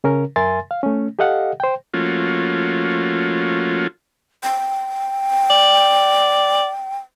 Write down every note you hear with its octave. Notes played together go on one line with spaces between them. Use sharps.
C#3 C#4 A#4
F#2 A#4 E5 G#5 C6 A6
F5
A3 C#4
G4 A4 D#5 F5 F#5
C5 G5
F3 A3 A#3 C#4 F4 F#4
G5
D5